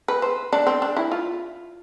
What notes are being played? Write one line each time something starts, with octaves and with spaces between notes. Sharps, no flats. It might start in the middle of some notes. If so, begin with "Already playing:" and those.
B4
C5
D4
C4
D4
E4
F4